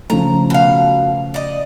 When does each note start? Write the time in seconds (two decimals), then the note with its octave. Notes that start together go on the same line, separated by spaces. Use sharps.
0.10 C#3 F3 A3 A#5
0.50 B2 F5
1.34 D5 D#5